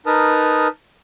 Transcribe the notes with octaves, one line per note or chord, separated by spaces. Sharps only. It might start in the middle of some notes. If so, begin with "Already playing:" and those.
D#4 A#4 B4 A5 D#6 F6